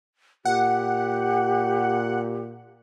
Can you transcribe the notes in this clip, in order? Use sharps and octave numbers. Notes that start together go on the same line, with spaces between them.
A#2 G4 F#5